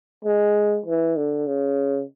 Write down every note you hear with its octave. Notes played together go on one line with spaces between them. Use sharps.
G#3
E3
D3
C#3